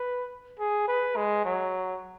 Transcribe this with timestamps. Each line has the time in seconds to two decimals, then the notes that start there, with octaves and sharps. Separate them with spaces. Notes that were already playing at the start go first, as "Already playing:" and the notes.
Already playing: B4
0.59 G#4
0.88 B4
1.16 G#3
1.45 F#3